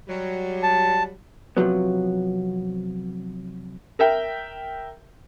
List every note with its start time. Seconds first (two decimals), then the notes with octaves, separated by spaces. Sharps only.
0.08 F#3 G3
0.63 A5
1.57 C3 F3 F#3 B3
3.99 A#4 E5 G5